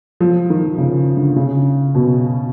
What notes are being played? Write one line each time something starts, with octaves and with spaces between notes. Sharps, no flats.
F3
D#3
C#3
D3
C#3
B2